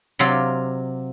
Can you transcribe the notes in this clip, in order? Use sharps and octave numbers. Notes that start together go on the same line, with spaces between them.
C3 F#3 F4 D5 F5